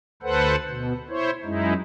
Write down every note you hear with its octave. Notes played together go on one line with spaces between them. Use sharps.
D2 A4 B4 C5 F#5
B2
E4 C5 C#5
F#2 G#3 D#4 E4